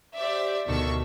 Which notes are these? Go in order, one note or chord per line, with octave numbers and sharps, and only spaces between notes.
G4 C5 D5 E5
D2 B2 D#3 A4 C#6 E6